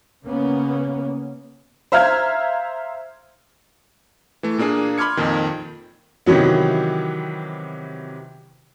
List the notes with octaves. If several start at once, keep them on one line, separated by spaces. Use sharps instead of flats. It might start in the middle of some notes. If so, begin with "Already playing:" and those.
C#3 A#3 B3 C#4
C5 E5 F5 A#5 F6 G#6
E3 A3
A#2 A#3 D4 G#4 C7
B5 C6 D6 F6 G#6 C#7
F2 A#2 D#3
C3 D#3 E3 F#3 B3